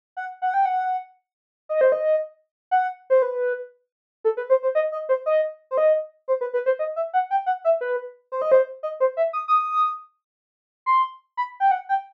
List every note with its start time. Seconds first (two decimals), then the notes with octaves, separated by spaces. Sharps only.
0.17 F#5
0.42 F#5
0.54 G5
0.65 F#5
1.69 D#5
1.81 C5
1.92 D#5
2.71 F#5
3.10 C5
3.22 B4
4.24 A4
4.37 B4
4.50 C5
4.63 C5
4.75 D#5
4.92 D#5
5.09 C5
5.26 D#5
5.71 C5
5.78 D#5
6.28 C5
6.41 B4
6.53 B4
6.66 C5
6.79 D#5
6.96 E5
7.13 F#5
7.31 G5
7.46 F#5
7.65 E5
7.81 B4
8.32 C5
8.42 D#5
8.52 C5
8.83 D#5
9.00 C5
9.17 E5
9.33 D#6
9.48 D#6
10.86 C6
11.37 B5
11.60 G5
11.71 F#5
11.89 G5